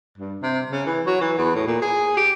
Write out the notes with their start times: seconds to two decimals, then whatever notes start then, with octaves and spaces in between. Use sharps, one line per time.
0.18 G2
0.43 C3
0.72 C#3
0.86 E3
1.06 F#3
1.21 E3
1.38 E2
1.55 A2
1.67 A#2
1.82 G#4
2.17 G4